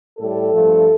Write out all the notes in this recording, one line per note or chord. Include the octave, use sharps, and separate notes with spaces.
A2 G3 A4
G2 F3 A3